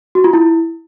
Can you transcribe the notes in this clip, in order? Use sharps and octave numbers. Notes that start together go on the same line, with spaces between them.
F#4
F4
E4